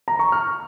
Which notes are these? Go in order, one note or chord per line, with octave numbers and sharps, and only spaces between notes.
A#5
C#6
F6